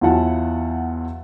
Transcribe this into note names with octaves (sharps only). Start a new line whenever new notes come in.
E2 F#3 E4 F4 F#5 A5